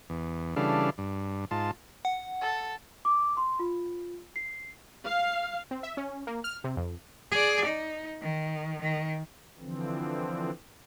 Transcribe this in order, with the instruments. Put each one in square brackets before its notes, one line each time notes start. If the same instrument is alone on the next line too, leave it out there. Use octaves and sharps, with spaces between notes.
[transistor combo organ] E2
C#3 E3 G3 D4 A4 F5
G2
G#2 F4 A5
[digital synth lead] F#5
[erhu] A4
[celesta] D6
C6
F4
C7
[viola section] F5
[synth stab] C4
E5
C#4
A#3
F6
C3
F2
[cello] G#4 D5
D#4
D#3
D#3
[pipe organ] D3 E3 F3 C4